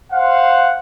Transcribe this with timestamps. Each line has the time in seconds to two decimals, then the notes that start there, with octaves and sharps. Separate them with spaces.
0.12 C5 F5 F#5